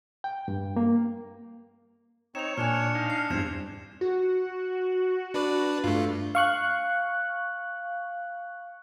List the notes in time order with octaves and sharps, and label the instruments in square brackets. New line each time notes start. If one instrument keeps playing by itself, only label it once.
[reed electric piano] G5
G2
A#3
[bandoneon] C4 D#4 [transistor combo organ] C#5 [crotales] E7 F7
[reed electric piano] A#2 G#5 [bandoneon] D4 [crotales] F6 C#7 E7
[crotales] C#7 F7
[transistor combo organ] D#4 F5
[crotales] C7
[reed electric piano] E2 G2 [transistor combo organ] E3 C4 [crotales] G#6 E7
[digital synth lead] F#4
[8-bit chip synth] D4 B4 D5
[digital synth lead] G2 [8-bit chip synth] A3 F4
[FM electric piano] F5 C#6 F#6